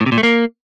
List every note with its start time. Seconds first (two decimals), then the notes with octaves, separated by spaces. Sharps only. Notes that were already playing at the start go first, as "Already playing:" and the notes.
0.01 A2
0.06 C3
0.12 A#2
0.18 A3
0.23 A#3